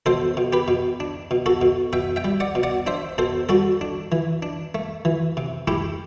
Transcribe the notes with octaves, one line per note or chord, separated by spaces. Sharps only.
B2 A4 C5
B2
G4 B4
B2
D4
B2
F#4 A4
B2
B2 E5 G5
E5 G5
G3
D5 F#5
B2
D5 F#5
D4 C5 E5
B2 A4 C5
G3 F#4 A4
D4
E3
D4
A3
E3
C3
A3 E4 G4